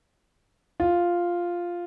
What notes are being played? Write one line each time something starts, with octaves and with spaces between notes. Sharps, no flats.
F4